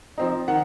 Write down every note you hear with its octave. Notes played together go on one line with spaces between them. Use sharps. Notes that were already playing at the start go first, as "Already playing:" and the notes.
F3 C4 D#4
D#3 F#5